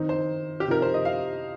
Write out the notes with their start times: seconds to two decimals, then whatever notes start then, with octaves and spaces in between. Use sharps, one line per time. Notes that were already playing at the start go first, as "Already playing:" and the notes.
Already playing: D#3 C4 D#4
0.09 C5
0.60 G4
0.67 C3 F3 D#4 A#4
0.82 C5
0.94 D#5
1.05 F5